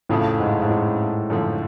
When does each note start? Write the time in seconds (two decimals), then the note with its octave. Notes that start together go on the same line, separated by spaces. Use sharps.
0.09 F2 A2 C#3 F3 A3
0.40 G#2
0.62 G#2
0.70 A2
1.30 F#2 D3 F3 A3